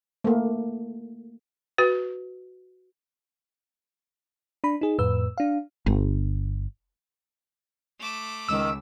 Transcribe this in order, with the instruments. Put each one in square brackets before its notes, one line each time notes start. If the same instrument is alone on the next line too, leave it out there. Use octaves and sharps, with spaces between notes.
[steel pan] A3 A#3
[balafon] F#4 B4
[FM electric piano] D4 B5
D#4 G#4
F2 A2 B4 E6
D4 F5
[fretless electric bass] G1
[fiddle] A3 D6
[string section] C#2 [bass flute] D#3 [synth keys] E6